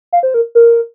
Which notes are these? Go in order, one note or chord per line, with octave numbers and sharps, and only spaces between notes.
F5
C5
A#4
A#4